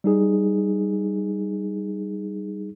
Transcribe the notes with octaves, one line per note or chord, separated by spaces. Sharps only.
G3 D#4 G#4